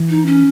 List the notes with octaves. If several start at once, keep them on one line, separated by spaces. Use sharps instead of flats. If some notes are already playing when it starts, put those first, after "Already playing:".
Already playing: E3
D#4
C#4